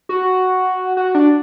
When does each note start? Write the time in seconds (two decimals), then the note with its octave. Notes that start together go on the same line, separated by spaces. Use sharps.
0.09 F#4
0.97 F#4
1.15 D4